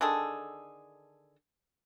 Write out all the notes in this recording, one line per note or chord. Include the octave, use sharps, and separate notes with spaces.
D3 D#3 G#4 A4